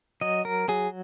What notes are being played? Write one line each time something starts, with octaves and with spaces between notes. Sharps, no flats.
F#3 D#5
A#4
F#3 G#4